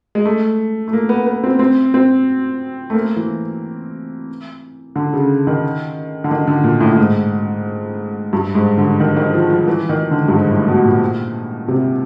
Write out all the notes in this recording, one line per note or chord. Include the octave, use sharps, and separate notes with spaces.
G#3
A3
A3
A#3
B3
B3
C4
C4
C4
A3
A#3
E3
D3
C#3
D#3
D3
D#3
D3
A#2
A2
A2
G#2
G2
G#2
D3
D#3
D#3
F3
F3
E3
D#3
D3
G2
G#2
A2
B2
A#2
C3